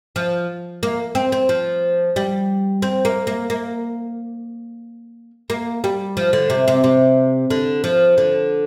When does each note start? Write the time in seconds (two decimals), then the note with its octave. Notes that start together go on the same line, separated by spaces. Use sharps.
0.16 F3
0.83 A#3
1.15 C4
1.32 C4
1.49 F3
2.16 G3
2.82 C4
3.05 A#3
3.27 A#3
3.50 A#3
5.50 A#3
5.84 G3
6.17 F3
6.33 D3
6.50 C3
6.68 C3
6.84 C3
7.50 D3
7.84 F3
8.18 D3